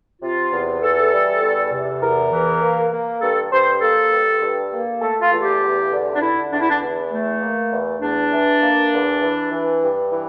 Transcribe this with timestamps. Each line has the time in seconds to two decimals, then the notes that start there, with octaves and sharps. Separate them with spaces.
0.22 C3 F4
0.52 E2
0.82 E3 A4
1.12 G3
1.42 E2
1.72 C3
2.01 E2 A#4
2.32 E3
2.61 A#3
2.92 A#3
3.21 G2 A4
3.52 G2 C5
3.81 A#3 A4
4.12 G2
4.42 G2
4.72 A#3
5.01 A3 A4
5.21 F4
5.32 E2
5.42 G4
5.62 E2
5.91 D3
6.16 D4
6.21 D3 E4
6.52 E2 D4
6.61 E4
6.70 D4
6.81 E2
7.11 A3
7.41 A#3
7.71 E2
8.01 E2 D4
8.32 E3
8.62 A#3
8.92 E2
9.21 E3
9.51 E3
9.82 G2
10.12 E3